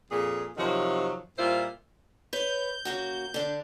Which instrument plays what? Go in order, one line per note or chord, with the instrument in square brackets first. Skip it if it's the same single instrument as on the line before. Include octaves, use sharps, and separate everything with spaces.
[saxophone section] F2 A#2 G#4
C3 D#3 F3 F#3
A#2 G3 E4 F4 C5
[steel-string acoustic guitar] B4 C#5 [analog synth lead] G6
[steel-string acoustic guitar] C#3 A#3 F#4
D3 D4